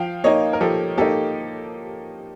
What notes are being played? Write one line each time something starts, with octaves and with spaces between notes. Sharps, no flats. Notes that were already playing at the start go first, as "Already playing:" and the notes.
Already playing: F3 F5 G5
A#3 D#4 C#5 D#5
A#4
F3 G4 A4
A#3 D#4 G4 A4